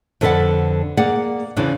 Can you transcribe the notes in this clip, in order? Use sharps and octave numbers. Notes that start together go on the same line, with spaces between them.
F2 D3 A4 B4 D5 F#5
A#3 G#4 D5 F#5
E2 C#3 E3 C4 D4